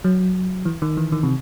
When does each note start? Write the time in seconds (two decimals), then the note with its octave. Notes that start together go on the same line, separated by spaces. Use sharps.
0.04 F#3
0.65 E3
0.82 D#3
0.97 E3
1.12 D#3
1.23 C3